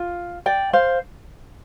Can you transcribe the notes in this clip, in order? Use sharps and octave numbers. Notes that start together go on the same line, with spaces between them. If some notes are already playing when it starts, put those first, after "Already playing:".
Already playing: F4
D5 G5
C5 F5